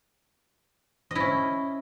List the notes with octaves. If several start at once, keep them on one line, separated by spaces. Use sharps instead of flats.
C#4 E4 D#5